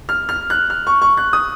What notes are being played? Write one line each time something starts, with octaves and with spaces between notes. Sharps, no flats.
F6
F6
F#6
F6
C#6
C#6
F#6
D#6